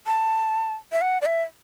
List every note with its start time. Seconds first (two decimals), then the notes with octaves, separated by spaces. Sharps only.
0.07 A5
0.92 E5
1.01 F#5
1.22 D5
1.26 E5